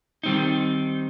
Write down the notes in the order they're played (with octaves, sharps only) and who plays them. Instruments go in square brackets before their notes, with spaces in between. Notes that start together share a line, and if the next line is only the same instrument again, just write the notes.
[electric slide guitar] D#3 G3 C4 D#4